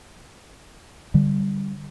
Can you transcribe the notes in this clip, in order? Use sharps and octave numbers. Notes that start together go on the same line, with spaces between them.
D3 G3